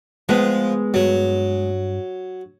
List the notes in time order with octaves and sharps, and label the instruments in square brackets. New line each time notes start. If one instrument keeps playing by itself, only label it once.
[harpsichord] F3 [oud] G#3 B3
[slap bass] G2 G3 [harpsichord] F#3